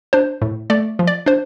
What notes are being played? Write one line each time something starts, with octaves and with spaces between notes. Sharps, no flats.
D4 C5
A2
A3 D5
F3
D5
D4 C5